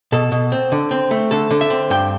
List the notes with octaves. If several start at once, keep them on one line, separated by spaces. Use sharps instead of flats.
B2 A4
B2
C4
D3
C4
A3
D3 A4
D3
E5
C4
G2 G5